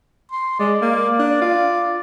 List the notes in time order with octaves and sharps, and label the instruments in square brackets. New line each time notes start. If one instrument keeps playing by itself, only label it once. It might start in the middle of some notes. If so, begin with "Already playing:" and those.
[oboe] C6
[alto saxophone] G#3 [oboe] D5
[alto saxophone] A#3
D4
F4